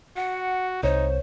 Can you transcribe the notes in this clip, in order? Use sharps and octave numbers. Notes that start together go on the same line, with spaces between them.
F#4 F#5
C2 D#4 C5 C#5